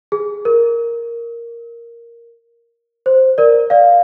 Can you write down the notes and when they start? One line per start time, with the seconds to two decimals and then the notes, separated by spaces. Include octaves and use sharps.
0.12 G#4
0.45 A#4
3.06 C5
3.38 A#4 D5
3.70 D5 F5